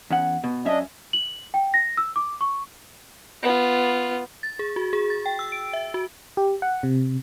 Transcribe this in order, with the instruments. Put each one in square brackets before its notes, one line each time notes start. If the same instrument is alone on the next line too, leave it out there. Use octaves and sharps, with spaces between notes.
[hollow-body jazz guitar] E2 C#4 F#5
B2
[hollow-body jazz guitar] F#2 C#4 E5 [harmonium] D4 D#5
[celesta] F#7
G5
A#6
E6
D6
C#6
[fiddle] B3 F4
[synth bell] A6
G#4
F#4
G#4
A6
G5
E6
D7
E5
F#4
[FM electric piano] G4
F#5
C3